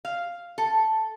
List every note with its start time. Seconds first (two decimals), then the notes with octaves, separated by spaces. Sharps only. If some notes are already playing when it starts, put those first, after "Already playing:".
0.05 F5
0.58 A4